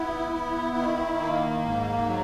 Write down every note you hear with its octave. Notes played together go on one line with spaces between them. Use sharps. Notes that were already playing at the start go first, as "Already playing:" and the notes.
Already playing: B3 E4
E4
D#3
A#3
G#2
F#3